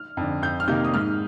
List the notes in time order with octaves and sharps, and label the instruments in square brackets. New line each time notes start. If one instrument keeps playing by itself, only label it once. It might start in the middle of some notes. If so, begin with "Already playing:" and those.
Already playing: [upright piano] F6
F2 D3
F2 G6
F6
C3 D#3 A#3 D#4 G6
D#6
G#2 F6